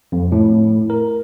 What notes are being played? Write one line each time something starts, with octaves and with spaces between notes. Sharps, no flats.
F2
A2
A#4